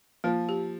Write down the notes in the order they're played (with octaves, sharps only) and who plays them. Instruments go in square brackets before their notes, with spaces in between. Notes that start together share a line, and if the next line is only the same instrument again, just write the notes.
[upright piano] F3 [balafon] A#3
[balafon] G4